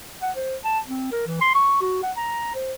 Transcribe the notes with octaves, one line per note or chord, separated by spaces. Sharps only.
F#5
C5
A5
C4
A#4
E3
C6
C#6
F#4
F#5
A#5
C5